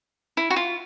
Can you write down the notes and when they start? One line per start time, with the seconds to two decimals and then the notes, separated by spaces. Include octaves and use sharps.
0.37 E4
0.50 F#4
0.56 F4